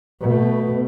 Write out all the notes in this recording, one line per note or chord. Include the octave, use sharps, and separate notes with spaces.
B2 A3